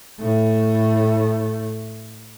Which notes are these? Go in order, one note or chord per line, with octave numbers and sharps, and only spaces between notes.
A2 A3